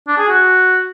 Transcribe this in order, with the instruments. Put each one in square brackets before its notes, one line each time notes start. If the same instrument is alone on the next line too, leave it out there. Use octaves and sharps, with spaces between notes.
[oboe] D4
G#4
F#4